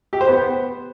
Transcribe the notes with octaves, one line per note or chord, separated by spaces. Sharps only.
G4
C5
B3